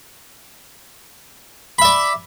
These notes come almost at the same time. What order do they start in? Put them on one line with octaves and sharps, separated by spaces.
B5 E5 D5